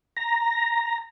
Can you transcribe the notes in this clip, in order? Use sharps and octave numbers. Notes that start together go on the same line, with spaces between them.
A#5